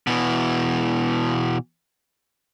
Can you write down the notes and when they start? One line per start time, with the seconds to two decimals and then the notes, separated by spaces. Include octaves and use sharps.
0.07 B2 E3